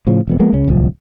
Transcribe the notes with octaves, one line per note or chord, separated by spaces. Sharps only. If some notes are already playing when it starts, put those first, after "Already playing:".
A2 C#3 F3
E1 F2 B3
F3 G#3 A#3 B3
C#2 C#3 C#4
D1 C2 F3